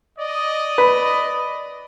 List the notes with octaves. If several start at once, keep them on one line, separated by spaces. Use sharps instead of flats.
D5 D#5
B4